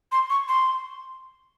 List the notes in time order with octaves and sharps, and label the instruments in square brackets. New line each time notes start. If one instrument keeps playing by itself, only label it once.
[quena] C6
C#6
C6